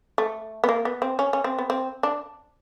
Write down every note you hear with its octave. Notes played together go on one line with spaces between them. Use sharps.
A3
B3
A#3
B3
C4
C#4
C#4
C4
B3
C4
D4